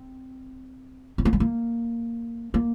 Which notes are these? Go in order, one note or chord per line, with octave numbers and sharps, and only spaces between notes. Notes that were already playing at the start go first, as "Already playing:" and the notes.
Already playing: C4
C4
A#3
G#3
A#3
A#3